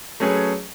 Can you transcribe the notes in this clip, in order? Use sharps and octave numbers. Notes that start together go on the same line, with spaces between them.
F#3 A3 C#4 G#4 B4